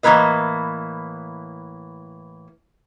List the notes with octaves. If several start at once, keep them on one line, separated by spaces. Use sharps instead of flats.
A2 E3 F#3 A#3 B4 D#5